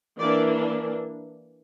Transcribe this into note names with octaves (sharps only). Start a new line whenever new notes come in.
E3 A#3 D4 D5